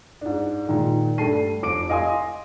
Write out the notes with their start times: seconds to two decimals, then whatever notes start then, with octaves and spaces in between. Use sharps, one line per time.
0.21 G#2 D4
0.67 A#2 D#3 G#3
1.18 G2 G3 A3 A5 C7 D#7
1.63 F1 D6 D7
1.89 D#5 F5 G#5 C6 D#6